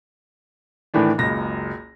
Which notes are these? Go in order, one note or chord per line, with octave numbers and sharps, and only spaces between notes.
A2 D#3 E3 D4
F#1 C#2 A#6